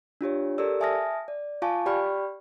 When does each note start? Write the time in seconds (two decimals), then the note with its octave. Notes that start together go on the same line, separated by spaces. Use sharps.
0.21 D4 F4 G4 C#5
0.58 G4 A4 A#4 D5 E6
0.80 E5 G#5 A5 D#6 F6 A#6
1.28 D5
1.62 F4 F5 G#5 A5 C#6 D6
1.86 G4 D5 G5 B5 C#6 F6